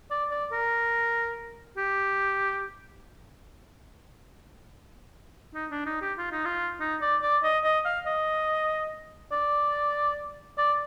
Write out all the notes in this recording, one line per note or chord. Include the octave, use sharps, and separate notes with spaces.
D5
D5
A#4
G4
D#4
D4
D#4
G4
F4
D#4
F4
D#4
D5
D5
D#5
D#5
F5
D#5
D5
D5